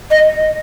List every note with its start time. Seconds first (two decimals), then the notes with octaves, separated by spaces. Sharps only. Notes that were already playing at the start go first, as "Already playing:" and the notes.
0.11 D#5